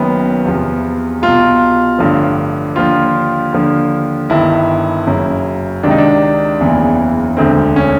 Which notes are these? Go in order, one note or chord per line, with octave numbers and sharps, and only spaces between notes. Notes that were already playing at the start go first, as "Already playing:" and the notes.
Already playing: F#1 F#2 D#3 B3
E2 C3 F3
C2 B2 F4
A1 G2 D3 F3
D#2 D3 F3 F4
D#2 D3 F3
G1 G2 D#3 E4
F#1 F#2 C#3
C#2 C3 D#3 D4
D#4
D4
F#1 E2 C#3 E3
E1 D2 D3 C4
C#4